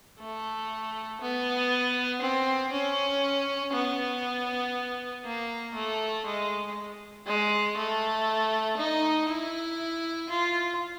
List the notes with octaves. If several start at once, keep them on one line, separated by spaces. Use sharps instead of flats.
A3
B3
C4
C#4
B3
A#3
A3
G#3
G#3
A3
D#4
E4
F4